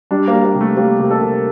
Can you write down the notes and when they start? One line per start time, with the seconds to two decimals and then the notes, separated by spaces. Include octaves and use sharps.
0.11 G3 D4
0.28 A#3
0.34 G3
0.44 A#3
0.55 C3
0.61 A3
0.77 G3 A#3
1.00 C3
1.11 A4
1.21 C3